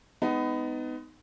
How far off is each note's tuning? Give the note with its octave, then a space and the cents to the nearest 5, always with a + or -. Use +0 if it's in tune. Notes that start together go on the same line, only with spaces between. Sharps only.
G#3 +0 B3 +25 D#4 +0